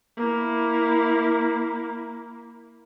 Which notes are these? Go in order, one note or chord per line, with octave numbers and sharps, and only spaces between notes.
A#3 E4